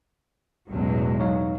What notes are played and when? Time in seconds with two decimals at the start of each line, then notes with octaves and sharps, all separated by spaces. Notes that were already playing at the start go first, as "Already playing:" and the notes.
0.70 A1 E2 B2 F#3 G#3
1.20 F#3 D#4 C#5 F5